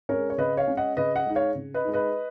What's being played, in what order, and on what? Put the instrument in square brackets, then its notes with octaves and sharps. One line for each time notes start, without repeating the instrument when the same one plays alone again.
[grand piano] G#3 C#4 A#4 C#5
C#5
C#3 B4 D#5
C#5 F5
G#3 C#4
D#5 F#5
C#3 B4 D#5
D#5 F#5
G#3 D#4
C#5 F5
C#3
B4 D#5
G#3 D#4
B4 D#5